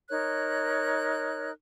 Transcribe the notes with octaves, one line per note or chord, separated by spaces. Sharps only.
D#4 A#4 C#5 F#6